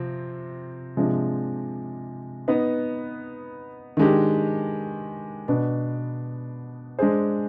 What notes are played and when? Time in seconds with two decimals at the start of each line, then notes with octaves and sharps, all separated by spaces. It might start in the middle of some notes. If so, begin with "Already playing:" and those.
Already playing: C3 F3 C4
0.97 C3 F3 G#3 D4
2.48 B3 D#4 B4
3.97 D#3 G#3 D4 G4
5.48 B2 B3 D4
6.99 G#3 D4 G#4 C5